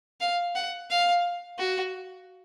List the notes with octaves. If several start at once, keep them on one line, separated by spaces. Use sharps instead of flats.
F5
F#5
F5
F#4